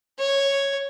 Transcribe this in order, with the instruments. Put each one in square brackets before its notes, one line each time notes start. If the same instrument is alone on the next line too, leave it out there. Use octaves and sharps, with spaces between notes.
[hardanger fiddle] C#5